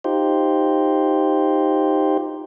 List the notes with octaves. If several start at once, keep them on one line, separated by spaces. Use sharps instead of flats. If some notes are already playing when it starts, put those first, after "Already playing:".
D#4 F4 G4 C5